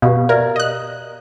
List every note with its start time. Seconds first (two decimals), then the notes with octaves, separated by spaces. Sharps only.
0.02 B2 G4 F5
0.29 A#4 D5 E5
0.56 D#5 F#6